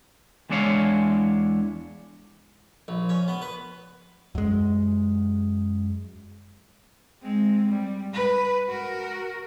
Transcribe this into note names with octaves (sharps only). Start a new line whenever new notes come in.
E2 G#3 D4 E4 C#5 F5
A#1
C#4
B3
B4
F#2 G#3
G#3 C4
G3
B4
F#4 A#4